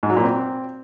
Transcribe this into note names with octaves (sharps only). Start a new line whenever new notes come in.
G#2
F#3
A#2
C4